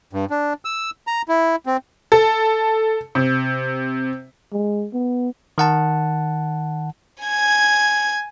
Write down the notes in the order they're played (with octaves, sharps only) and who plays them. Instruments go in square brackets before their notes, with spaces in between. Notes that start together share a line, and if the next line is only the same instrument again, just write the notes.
[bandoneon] G2
D4
E6
A#5
E4
C4
[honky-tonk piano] A4
C3
[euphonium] G#3
B3
[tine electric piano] D#3 F#5 A5
[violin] G#5 G#6